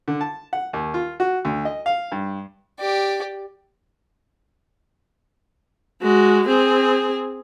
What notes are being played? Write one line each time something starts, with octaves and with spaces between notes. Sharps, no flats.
D3
A5
F#5
D#2
F4
F#4
D2
D#5
F5
G2
G4 D5
G#3 F#4
C4 G#4